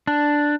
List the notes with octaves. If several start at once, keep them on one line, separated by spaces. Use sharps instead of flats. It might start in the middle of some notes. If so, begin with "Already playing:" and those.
D4